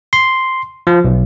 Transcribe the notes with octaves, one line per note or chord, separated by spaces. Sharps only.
C6
F3
B1